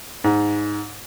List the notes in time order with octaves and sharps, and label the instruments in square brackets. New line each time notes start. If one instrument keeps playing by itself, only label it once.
[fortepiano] G#2